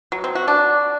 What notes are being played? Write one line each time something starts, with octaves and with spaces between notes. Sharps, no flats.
F#3
C4
F#4
D4